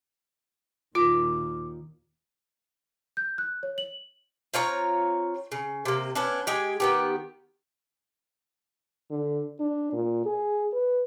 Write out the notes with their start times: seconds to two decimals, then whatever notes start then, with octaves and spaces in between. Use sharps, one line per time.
0.95 D#2 A#2 D#3 F4 D6
3.17 G6
3.38 F#6
3.63 C#5
3.78 F#7
4.54 C4 F4 C#5 A#5
5.52 C#3
5.85 C3 A#3
6.15 B3 C#4 D4
6.47 G#3 G4
6.80 D#3 B3 G4
9.11 D3
9.60 D4
9.93 A#2
10.26 G#4
10.73 B4